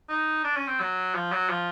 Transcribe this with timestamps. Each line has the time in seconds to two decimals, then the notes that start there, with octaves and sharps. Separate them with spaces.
0.09 D#4
0.44 D4
0.57 C#4
0.68 C4
0.80 F#3
1.15 F3
1.32 F#3
1.50 F3